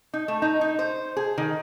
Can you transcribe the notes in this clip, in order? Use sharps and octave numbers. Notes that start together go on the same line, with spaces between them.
D#4
A3
D#4
D#4
C5
G#4
D#3